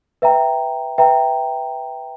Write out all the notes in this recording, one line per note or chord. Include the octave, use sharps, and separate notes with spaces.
B4 E5 G5 A#5
B4 E5 G5 A#5